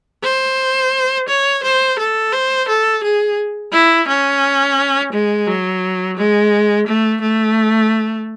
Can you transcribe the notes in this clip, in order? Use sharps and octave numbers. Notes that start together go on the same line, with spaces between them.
C5
C#5
C5
A4
C5
A4
G#4
E4
C#4
G#3
F#3
G#3
A3
A3